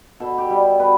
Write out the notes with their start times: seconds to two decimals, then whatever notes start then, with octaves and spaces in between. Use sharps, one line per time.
0.20 B2 A4
0.38 G4
0.50 G3 A4
0.79 B2 B4